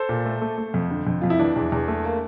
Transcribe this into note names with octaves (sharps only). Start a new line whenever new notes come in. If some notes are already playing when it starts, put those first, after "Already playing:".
Already playing: A4 C5
A#2
A3
A3
A3
F2
D3
F2
F2 F4
E4
E3 D4
E2
E2
A3
A#3